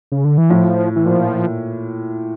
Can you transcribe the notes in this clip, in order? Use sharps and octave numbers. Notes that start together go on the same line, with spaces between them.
C#3
D3
E3
A2 F3
E3
A#2 F3